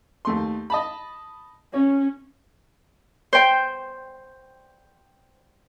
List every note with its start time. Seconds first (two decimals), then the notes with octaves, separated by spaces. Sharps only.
0.25 D#2 A3 C6
0.70 D#5 A5 B5
1.74 C#4 C#5
3.33 C5 G5